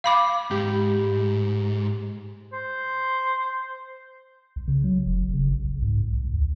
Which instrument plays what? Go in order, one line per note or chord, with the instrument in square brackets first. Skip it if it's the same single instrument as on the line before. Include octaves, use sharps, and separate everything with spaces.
[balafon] F5 B5 D6
[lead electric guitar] G#2 [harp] G4
[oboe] C5
[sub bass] C2
C#3
F#3
F1
G1
C#3
A1
C2
G#2
B1
C2
D2